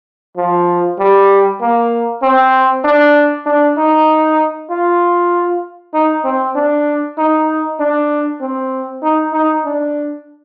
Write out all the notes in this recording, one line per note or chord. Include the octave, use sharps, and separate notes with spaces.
F3
G3
A#3
C4
D4
D4
D#4
F4
D#4
C4
D4
D#4
D4
C4
D#4
D#4
D4